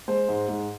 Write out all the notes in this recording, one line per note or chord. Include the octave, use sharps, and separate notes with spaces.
G#3 C5
G#2
G#2